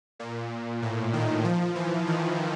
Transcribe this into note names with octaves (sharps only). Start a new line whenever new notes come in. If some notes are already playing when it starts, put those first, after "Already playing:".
A#2
A2
D#3
F3
E3
D#3